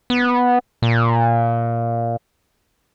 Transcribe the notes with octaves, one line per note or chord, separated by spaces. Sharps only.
B3
A#2